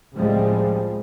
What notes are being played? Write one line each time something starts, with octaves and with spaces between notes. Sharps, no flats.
C#2 A2 F3 G3 G#3 C4